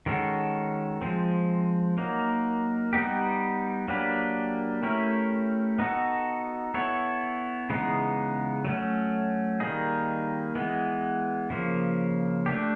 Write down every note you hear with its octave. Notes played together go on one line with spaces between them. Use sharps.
D#3 G#3 C#4 F#4 A4
F3 G#3 C4
F#3 A#3 D#4
G3 B3 D#4 G4
F#3 A#3 D4 G4 B4
A3 C#4 E4 G4 A#4
B3 D#4 F#4 A4
B3 E4 A4 C#5
C#3 E3 G#3 B3 D#4
F#3 A3 C#4
D#3 G3 A#3 D#4 G#4
E3 G#3 B3
C#3 F3 A#3
A3 D4 G4